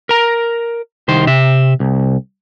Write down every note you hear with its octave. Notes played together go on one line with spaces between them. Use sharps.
A#4 A#5
C2 D#3 C5
C3 E5
C2